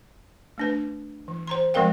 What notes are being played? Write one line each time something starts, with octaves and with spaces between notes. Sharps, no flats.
A3 D4 B4
E3
C5 A#5 C6
F3 G#3 C4 A#4 F5 G5